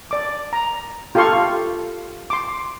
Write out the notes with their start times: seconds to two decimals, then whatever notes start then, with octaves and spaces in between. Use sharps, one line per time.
0.11 D5 D6
0.53 A#5
1.15 F4 G4 A4 F5 C6 C#6
2.30 C6 D6